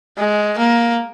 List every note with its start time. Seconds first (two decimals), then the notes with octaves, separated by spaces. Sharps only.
0.18 G#3
0.58 A#3